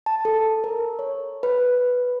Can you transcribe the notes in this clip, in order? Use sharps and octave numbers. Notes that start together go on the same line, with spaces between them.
A5
A4
A#4
C#5
B4